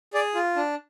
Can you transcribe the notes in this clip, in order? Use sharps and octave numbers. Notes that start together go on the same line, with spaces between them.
G#4 D5
F4
D4